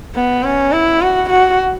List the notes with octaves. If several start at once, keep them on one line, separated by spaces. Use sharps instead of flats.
B3
C#4
E4
F#4
F#4